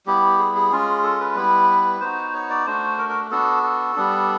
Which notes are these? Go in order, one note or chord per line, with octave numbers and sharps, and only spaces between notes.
G3 B3 E4 G4
G#4
G#4
G#3 C#4 F4
A4
B4
G3 B3 E4
B3 D#4 F#4 C5
C#5
D5
A3 D4 F#4 C5
A#4
A#4
B3 D4 F#4 A4
A4
G3 B3 D4